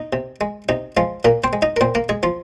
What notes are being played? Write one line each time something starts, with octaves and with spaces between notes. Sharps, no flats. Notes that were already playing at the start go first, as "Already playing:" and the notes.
Already playing: D#4
C3
G#3
C3 D#4
F3 G#3 F4
A#2 A#3 A#4
C4 C5
G#3
D#4 D#5
A#4
A#2 C4 C5
A#3 A#4
G#3 G#4
F3 F4